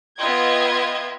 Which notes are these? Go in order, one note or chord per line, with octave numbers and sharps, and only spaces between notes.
B3 F4 D#5 E5 G5 G#6